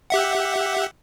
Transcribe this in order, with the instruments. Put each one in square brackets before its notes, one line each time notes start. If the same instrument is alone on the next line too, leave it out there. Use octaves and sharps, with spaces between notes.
[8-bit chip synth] G4 E5 F#5